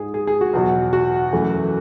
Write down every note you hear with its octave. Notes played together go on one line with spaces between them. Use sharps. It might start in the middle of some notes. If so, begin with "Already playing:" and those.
Already playing: G#2 G#3 G#4
G#4
G#4
F#4
E2 B2 F#3
F#4
F#2 E3 A3